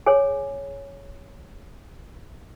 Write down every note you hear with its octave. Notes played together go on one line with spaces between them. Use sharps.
G#4 C#5 G#5